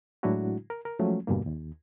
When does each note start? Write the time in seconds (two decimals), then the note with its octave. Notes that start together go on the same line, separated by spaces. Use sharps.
0.23 A2 F#3 G#3 D4 E4 F#4
0.70 A#4
0.85 A#4
0.99 F3 F#3 G#3 A3 C#4
1.27 E2 G2 B2 D3 A#3
1.46 D#2